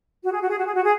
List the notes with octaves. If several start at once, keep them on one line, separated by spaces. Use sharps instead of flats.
F#4
G#4
F#4
G#4
F#4
G#4
F#4
G#4